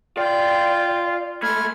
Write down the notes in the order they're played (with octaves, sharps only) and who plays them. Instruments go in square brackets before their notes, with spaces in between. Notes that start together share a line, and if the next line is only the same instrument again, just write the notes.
[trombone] F4 [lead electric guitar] D5 [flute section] G5
[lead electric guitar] G#3 A3 [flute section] B5 F6 G#6